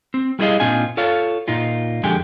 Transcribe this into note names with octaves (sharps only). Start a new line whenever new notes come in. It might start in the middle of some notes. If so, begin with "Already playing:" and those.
C4
G3 A3 E4 G#4 D#5 F5
A#2 C4 D4 D#4 F4 G#5
F4 A4 C#5 F5
A#2 D#4 F4
F2 D3 G#3 G4 G#5